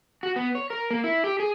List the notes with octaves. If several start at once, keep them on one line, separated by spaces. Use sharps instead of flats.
F#4
B3
C#5
A#4
A#3
E4
G4
G#4